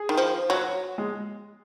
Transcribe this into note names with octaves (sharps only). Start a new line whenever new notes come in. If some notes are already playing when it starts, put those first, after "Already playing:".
Already playing: G#4
D#3
F3
F#3 F#4
G#3